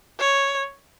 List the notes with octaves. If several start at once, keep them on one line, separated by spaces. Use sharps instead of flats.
C#5